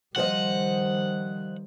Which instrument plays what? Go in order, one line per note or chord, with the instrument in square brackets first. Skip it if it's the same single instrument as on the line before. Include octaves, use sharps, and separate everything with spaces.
[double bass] D#3 G3 [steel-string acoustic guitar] F3 C5 D#5 [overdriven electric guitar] F#5